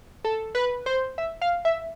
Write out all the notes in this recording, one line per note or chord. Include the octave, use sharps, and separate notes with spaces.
A4
B4
C5
E5
F5
E5